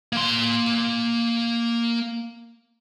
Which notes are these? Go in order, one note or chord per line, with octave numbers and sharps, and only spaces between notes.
A#3 C6